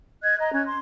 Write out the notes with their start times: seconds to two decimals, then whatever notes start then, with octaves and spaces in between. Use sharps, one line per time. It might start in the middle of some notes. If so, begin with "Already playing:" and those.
0.23 D#5 F#6 G#6
0.39 D#5 A#5
0.53 C#4 F#6 G#6
0.65 C6